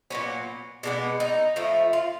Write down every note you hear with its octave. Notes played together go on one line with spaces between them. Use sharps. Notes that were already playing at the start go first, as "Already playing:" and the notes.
A#2 F#3 B3 C#4
B2 G#3 B3 D4
D#4
A2 F3 A3
F4